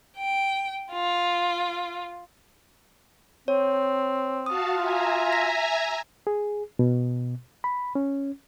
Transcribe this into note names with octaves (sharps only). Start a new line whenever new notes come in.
G5
F4
C4 C#5
F#4 F5 A5 D#6
F4 E5 G#5 A#5
A#6 B6
G#4
B2
B5
C#4